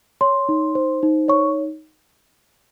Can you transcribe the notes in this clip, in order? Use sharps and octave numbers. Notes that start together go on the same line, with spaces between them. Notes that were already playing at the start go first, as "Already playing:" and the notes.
C#5 C6
D#4
C5
D#4
C#5 C#6